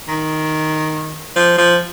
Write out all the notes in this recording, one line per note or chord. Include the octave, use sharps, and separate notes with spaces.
D#3
F3
F3